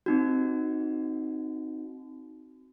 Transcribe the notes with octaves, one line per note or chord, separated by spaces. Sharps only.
C4 D#4 F#4